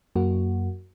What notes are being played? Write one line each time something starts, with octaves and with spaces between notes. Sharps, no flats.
F#2 A#3 F#4